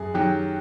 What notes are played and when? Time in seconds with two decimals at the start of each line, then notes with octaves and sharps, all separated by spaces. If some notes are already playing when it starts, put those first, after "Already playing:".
Already playing: F#2 G#4
0.14 D#3 F#3 G4